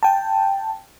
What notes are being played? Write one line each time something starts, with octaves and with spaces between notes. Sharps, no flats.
G5 A5